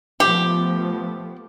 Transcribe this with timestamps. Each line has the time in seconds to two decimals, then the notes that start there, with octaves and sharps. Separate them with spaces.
0.20 F3 A3 B3 G4